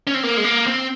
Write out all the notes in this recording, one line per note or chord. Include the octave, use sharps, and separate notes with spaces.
C#4
C4
A#3
G#3
A#3
C4